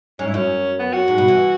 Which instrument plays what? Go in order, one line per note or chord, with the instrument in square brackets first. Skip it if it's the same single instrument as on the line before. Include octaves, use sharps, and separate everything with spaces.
[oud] G#2 [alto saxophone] C#4
[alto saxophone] E4
[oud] F#2 [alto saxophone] C#4
[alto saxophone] B3
F#4
[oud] G#2
B2
E3